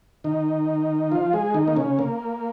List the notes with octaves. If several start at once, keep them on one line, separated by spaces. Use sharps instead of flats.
D#3 D#4
F3 F4
G#3 G#4
D#3 D#4
A#3
C#3 C#4
A#3